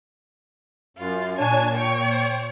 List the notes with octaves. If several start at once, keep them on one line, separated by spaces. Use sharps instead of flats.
F#2 F4
A#2 D4 C#5 G#5 A5
C#5 G5